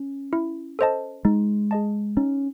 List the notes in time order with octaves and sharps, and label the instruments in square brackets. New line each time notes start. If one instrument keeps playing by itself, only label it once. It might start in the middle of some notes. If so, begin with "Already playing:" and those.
Already playing: [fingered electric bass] C#4
[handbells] E4
A4 C5 D#5 A5
[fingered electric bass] G#3 [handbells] D#4
[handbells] G#4 D#5 A5
[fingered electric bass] C#4 [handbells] D#4